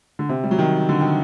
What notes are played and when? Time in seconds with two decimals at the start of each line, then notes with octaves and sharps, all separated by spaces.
0.19 D3
0.29 C3
0.44 G3
0.51 F#3
0.59 D#3
0.89 D3
1.01 D#3